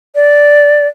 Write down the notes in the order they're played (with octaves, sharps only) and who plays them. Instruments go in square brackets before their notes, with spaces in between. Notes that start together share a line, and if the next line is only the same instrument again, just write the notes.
[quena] D5